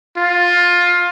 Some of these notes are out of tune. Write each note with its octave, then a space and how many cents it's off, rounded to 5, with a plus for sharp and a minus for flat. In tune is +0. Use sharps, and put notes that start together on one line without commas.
F4 +15